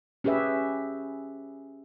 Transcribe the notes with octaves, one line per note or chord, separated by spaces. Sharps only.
C#4 G4 G#4 B4 E5